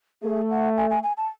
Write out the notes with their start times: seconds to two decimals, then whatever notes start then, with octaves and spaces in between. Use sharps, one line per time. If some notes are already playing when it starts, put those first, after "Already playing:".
0.23 A3 G#4
0.50 F#5
0.77 G#5
0.90 G#5
1.03 G#5
1.17 A5